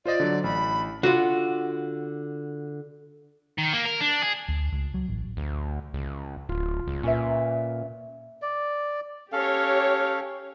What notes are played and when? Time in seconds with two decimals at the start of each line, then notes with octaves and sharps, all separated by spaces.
0.06 F4 C5 D5 D#5
0.20 D3 F#3
0.44 A1 B5
1.03 D3 F4 F#4
3.58 D#3
3.73 A#3
3.85 A#4
4.00 D4
4.22 G#4
4.48 D2
4.72 C#2
4.94 F#3
5.08 A1
5.37 D2
5.94 C#2
6.49 D1 F4
6.87 C#2
7.03 A#2 C#4 B4 E5
8.42 D5
9.32 C#4 G4 A4 C#5 F5